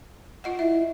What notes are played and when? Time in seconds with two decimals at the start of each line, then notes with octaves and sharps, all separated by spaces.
0.44 F4 D#5 F#5
0.59 E4 E5